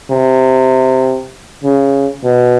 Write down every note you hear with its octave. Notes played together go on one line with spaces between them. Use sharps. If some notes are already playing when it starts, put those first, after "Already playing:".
C3
C#3
B2